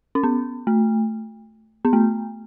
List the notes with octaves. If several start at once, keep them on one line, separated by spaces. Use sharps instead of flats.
C#4
B3
A3
B3
A3